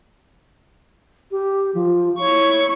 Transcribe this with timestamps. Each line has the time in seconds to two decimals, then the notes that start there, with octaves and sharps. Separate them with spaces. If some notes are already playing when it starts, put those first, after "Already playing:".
1.31 G4
1.74 F3
2.19 E4 C#5 C#6